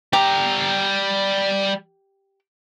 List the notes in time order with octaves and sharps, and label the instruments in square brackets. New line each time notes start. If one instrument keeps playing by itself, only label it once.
[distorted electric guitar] G3 A#5 [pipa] G4